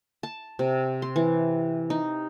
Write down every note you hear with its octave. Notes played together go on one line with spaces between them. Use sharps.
A5
C3
C6
E3
D#4